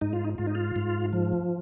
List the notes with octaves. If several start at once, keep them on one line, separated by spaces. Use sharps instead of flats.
G#2 D#4
F4
D#4
G#2 F4
D#4
F4
G#2
F3